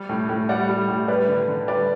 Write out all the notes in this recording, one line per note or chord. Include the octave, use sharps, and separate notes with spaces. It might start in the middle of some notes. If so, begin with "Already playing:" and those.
Already playing: G3
A2
A2
G3 D5 F#5
G3
A2
G3 B4 D5
D3
D3
G3 B4 D5